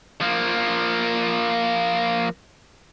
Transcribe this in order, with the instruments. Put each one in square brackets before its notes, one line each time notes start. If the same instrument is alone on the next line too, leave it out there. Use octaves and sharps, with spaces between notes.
[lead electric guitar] F3 A#3